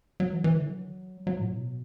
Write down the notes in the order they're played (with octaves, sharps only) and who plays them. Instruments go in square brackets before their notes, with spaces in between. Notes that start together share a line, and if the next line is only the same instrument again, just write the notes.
[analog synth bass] F#3
E3
E3
D3
F#3
F#3
A2
B2